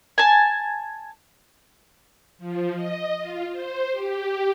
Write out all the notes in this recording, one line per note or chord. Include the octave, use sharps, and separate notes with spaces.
G#5 A5
F3
D#5
F4
C5
G4